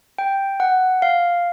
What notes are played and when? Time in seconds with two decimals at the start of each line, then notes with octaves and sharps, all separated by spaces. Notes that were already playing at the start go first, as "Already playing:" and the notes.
0.18 G5
0.60 F#5
1.02 F5